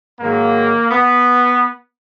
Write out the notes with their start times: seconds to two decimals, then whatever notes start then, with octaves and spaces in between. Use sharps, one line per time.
0.19 G#2 D#3 F#3 A#3
0.90 B3